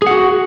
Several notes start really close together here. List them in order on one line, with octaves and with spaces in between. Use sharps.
G#4 F#5 F#4